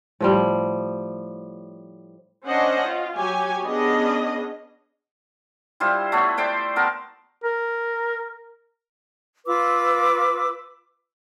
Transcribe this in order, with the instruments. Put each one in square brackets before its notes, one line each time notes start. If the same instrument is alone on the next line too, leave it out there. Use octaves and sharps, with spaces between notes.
[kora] A2 F3 G3
[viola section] C#4 D4 C5 D#5 F#5
F4
F#3 G4 C#5 G#5
B3 C#4 D4 G#4 D#5
[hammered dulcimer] G3 E4 F4 C5
A3 B3 C#5
C5 D5 G5 C6
B3 A#4 A5
[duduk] A#4
[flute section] F4 B4 D6 E6